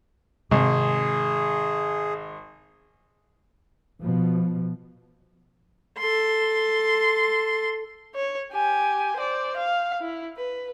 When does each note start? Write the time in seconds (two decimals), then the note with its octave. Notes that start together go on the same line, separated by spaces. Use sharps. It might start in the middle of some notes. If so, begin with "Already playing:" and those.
0.51 G#1 C3 G#4
4.00 B2 F3
5.98 A4 C6
8.15 C#5
8.52 G4 G#5
9.16 C5 D5
9.57 F5
10.01 E4
10.37 B4